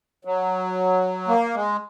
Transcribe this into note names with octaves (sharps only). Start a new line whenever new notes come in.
F#3
A#3
G#3